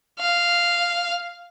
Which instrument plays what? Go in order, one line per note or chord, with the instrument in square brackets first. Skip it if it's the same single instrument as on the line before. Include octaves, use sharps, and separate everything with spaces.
[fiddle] F5